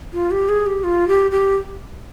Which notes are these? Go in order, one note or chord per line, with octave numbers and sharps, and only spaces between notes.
F4
G4
G#4
G4
F4
G4
G4